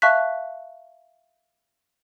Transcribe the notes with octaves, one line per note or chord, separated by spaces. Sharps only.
E5 F5 A5 C#6 F#6 B6